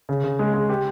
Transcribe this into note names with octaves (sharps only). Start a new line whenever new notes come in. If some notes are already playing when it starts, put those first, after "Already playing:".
C#3
C#3
G#3
G#3
G4